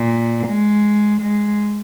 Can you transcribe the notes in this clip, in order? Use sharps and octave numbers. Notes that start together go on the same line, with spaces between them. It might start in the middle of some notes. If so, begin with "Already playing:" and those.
Already playing: A#2
G#3
G#3